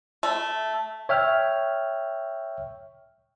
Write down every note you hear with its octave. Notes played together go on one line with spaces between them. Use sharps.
A3
C#5 E5 G5 F6